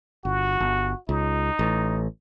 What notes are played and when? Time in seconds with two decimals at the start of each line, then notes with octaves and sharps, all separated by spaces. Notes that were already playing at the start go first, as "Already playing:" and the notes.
0.25 G1 F#4
0.60 G1
1.09 C#2 D#4
1.59 A1